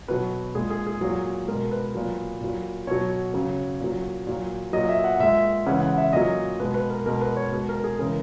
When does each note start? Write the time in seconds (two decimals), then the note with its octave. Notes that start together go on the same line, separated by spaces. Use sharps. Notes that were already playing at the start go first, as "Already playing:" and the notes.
0.08 B2 F#3 B4
0.55 A#2 G#3 G#4
0.70 G#4
0.87 G#4
1.01 A#2 F#3
1.48 B2 G#3 A#4
1.71 B4
1.95 A#2 F#3
2.41 A#2 F#3
2.87 B2 F#3 C#5
3.34 C#3 F#3
3.80 A#2 F#3
4.27 A#2 F#3
4.73 A#2 F#3 D#5
4.89 E5
5.04 F#5
5.19 A#2 G#3 E5
5.66 C#3 E3 G#3 F#5
5.82 F#5
5.98 E5
6.13 A#2 F#3 D#5
6.60 B2 G#3 B4
6.74 B4
6.90 A#4
7.06 B2 G#3 A#4
7.21 B4
7.37 C#5
7.52 B2 G#3
7.68 A#4
7.84 G#4
7.99 C#3 E3 G#3 A#4